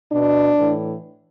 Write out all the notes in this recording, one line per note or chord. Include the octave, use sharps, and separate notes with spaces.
B2 D4
A2 E3